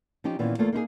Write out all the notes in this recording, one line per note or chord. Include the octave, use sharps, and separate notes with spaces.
F3 C#4 D#4 G4
A#2 D#3 E3 B3 C#4 F4
E2 A3 A#3 F4
A#3 D#4 E4 G#4